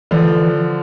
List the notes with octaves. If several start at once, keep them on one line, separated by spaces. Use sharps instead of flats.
D3 E3 F3